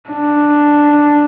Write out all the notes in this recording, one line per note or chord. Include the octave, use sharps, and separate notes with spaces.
D4